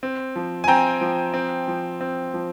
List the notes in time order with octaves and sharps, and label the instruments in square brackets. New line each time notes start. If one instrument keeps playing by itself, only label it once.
[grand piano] C4
F3
G#5
C4 G5 A#5
F3
C4
F3
C4
F3